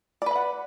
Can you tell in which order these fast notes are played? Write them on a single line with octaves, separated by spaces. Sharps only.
D5 B4 B5 F#5